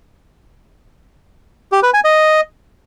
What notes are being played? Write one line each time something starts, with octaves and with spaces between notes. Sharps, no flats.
G4
B4
G#5
D#5